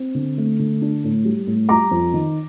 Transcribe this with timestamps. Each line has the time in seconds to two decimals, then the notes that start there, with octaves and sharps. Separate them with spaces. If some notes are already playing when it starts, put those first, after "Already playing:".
Already playing: C4
0.15 D3
0.38 A3
0.59 D3
0.82 D4
1.04 A2
1.25 G3
1.47 A2
1.69 G3 A#5 D6
1.91 F2
2.13 D#3